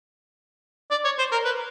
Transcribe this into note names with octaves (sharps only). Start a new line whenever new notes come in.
D5
C#5
C5
A#4
B4